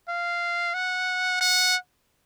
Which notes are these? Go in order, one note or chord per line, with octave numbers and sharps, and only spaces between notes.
F5
F#5
F#5